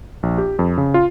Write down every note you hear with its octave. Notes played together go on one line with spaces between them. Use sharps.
A#1
G4
F2
C#3
F4